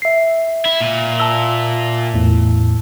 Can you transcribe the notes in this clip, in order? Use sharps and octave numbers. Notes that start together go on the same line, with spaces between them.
E5 C7
E4
A#2
A5 E6 G7
E2 A2